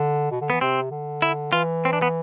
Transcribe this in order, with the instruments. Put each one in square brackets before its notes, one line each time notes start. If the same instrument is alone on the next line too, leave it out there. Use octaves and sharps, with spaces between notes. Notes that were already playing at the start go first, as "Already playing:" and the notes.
Already playing: [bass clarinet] D3
B2
D3
[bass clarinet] E3 [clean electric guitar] B3
[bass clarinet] C3 [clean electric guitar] C4
[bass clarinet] D3
[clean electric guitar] E4
[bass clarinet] E3 [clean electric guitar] F4
[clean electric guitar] C4
D4
B3